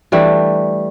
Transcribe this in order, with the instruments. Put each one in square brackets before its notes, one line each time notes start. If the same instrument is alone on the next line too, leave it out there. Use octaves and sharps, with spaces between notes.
[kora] E3 G3 A3 D4